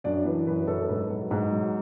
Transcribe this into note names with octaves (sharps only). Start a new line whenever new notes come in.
F#2 D4 D5
E3 B4
F#2 B4
F#2 A4
A4
G#2 B4
F#3
G#2
F#3